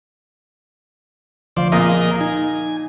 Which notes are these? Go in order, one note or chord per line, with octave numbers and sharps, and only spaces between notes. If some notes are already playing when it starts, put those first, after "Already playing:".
D2 F3 C5 D5 F5
A#2 A#3 G#4 A#4 D#5 D#6
D#4 G#5